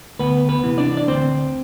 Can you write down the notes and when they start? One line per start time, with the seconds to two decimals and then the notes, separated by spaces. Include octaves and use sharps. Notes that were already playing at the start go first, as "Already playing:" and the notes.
0.19 D2 B3 B4
0.49 B3 B4
0.64 C3 E3
0.78 D4 D5
0.97 D5
1.08 D2 C4 C5